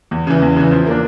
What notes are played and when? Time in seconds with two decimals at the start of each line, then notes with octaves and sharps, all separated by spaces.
0.11 E2
0.27 C#3 E3
0.42 E2
0.57 C#3 E3
0.71 F3
0.86 A#3 D4